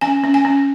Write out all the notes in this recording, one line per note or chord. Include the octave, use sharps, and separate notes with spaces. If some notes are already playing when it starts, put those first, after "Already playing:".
C#4 G#5
C#4
G#5
C#4